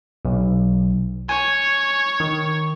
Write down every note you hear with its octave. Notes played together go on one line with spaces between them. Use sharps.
B1
C#5 G#5
D#3